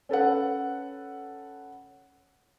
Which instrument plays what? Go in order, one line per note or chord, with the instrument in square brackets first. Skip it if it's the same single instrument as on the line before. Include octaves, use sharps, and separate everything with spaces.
[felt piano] C#4 A4 B4 F#5